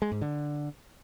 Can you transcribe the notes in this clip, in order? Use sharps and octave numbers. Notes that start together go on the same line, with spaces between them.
G#3
G#2
D3